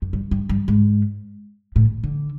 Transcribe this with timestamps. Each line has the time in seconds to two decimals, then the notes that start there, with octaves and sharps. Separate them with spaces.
0.02 F#2
0.13 G2
0.31 G2
0.49 G2
0.68 G#2
1.76 A2
2.04 D3